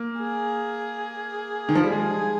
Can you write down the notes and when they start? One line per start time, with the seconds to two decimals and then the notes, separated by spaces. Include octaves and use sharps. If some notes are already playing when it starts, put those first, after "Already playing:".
Already playing: A#3
0.20 G#4
1.69 D#3
1.75 F3
1.83 G3
1.90 G#3 G#4